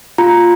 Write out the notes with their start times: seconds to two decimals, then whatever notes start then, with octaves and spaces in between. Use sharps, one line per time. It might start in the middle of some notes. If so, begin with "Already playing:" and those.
0.18 F4 A#5